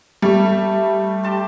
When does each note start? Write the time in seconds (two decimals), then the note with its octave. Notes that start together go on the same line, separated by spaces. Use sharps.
0.22 G3 A3
1.24 G4 A5 C6